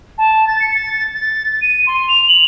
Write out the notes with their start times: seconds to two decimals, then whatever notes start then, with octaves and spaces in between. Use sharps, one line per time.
0.18 A5
0.47 A6
0.60 C#7
0.74 A6
1.14 A6
1.61 D#7
1.86 C6
2.08 F7
2.28 F#7